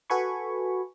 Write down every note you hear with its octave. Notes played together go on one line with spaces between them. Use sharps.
F#4 A4 B4 G#5 B5 C#6